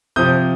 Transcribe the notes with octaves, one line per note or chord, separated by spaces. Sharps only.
C3 F3 D#6 G6